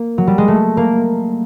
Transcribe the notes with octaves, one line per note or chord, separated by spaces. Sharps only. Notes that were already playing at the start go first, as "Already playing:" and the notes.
Already playing: A#3
F#3
G3
G#3
A3
A#3